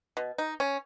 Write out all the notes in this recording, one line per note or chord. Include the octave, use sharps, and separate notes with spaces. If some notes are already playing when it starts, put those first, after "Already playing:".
B2
D#4
C#4